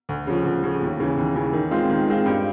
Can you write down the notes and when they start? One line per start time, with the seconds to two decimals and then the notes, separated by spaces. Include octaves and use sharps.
0.09 D2
0.27 C#3 F3
0.45 D2
0.63 C#3 F3
0.81 D#2
1.00 C#3 E3
1.17 D#2
1.36 C#3 E3
1.53 D#3
1.71 G#3 C4 F4
1.90 D#3
2.07 G#3 C4 F4
2.26 G2